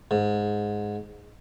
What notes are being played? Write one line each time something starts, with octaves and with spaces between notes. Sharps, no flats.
G#2